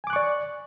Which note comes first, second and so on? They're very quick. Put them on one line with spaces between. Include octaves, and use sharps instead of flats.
G#5 D6 F#6 C#6 D5